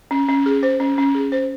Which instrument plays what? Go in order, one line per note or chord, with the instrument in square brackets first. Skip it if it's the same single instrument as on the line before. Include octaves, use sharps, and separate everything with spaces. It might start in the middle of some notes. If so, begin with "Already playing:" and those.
[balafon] C#4
C#4
G#4
C5
C#4
C#4
G#4
C5